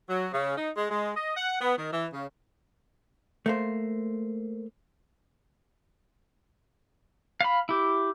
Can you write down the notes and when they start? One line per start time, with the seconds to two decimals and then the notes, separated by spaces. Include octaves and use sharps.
0.09 F#3
0.33 C#3
0.57 D#4
0.77 G#3
0.90 G#3
1.16 D#5
1.36 F#5
1.61 B3
1.78 D#3
1.93 E3
2.14 C#3
3.46 A3 A#3 C5
7.41 F5 B5
7.69 E4 G4